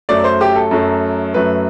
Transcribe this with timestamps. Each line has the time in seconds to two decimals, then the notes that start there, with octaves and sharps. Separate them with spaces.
0.09 F#2 F#3 A3 D5
0.24 C5
0.41 G4
0.56 A4
0.71 F#2 F#3 A3
1.34 F#2 F#3 A3 B4